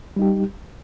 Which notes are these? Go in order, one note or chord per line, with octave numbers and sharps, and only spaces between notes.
G3 D#4 G4